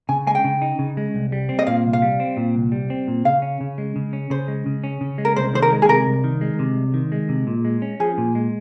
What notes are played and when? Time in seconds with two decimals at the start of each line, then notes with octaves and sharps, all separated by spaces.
0.09 C#3 G#5
0.27 G#3 G#5
0.35 G5
0.44 C#3
0.62 D#4
0.79 C#3
0.97 G#3
1.14 C2
1.32 G3
1.49 C4
1.59 D#5
1.67 A#2 F5
1.85 C2
1.93 F5
2.02 G3
2.20 C4
2.37 A#2
2.55 C2
2.72 G3
2.90 C4
3.08 A#2
3.25 C#3 F5
3.42 C#4
3.61 C#3
3.78 G#3
3.96 C#3
4.13 C#4
4.30 C#3 C5
4.48 G#3
4.66 C#3
4.84 C#4
5.01 C#3
5.18 G#3
5.25 A#4
5.36 C2 C5
5.53 D#3 C5
5.62 A#4
5.72 G#3
5.82 G#4
5.89 C3 A#4
6.07 C2
6.24 D#3
6.41 G#3
6.59 C3
6.76 C2
6.94 D#3
7.12 G#3
7.29 C3
7.47 A#2
7.65 G#3
7.82 C#4
8.00 F3 G#4
8.18 A#2
8.35 G#3